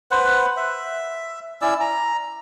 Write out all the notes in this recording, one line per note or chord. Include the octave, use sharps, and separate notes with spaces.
B4 C5 F#5
E5
C#4 E4 D5 E6
A#5